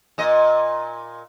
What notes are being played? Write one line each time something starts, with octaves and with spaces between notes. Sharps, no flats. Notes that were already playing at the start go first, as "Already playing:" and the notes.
A#2 D#5